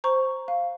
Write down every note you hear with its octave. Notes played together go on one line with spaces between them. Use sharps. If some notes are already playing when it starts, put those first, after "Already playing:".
C5 A#5 C#6
F5